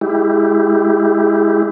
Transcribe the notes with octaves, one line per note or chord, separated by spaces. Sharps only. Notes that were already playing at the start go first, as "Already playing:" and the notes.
G#3 E4 G4